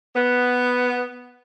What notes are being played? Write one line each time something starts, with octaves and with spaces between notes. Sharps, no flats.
B3